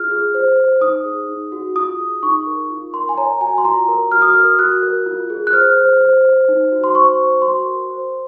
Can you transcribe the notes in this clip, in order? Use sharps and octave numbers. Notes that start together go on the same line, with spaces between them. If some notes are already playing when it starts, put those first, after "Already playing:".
Already playing: F4 G#4 F6
G#4
C5
C5
D#4 D#6
G#4
D#4
F#4
F4 D#6
G#4
D#4 C#6
A#4
F4
A#4 C6
G#5
C#5 A#5
F#4 G#5
C6
F4 A#5
A#4
F#4 F6
D#6
A#4 F6
F#4 F#6
A#4
F4
G#4
F#6
C5 F6
C5
C5
C5
D#4
F#4
C6
C5 C#6
C5
F#4 C6
A#4
C5